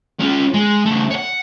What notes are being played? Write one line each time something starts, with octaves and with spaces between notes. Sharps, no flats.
C#4 F4
G#3
C#3 A3
C#5 F#5